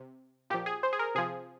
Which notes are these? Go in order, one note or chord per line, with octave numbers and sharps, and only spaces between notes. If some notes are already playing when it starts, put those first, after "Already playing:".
Already playing: C3
A#2 F3 G4
G#4
C5
G#4
A#4
C3 F3 G#4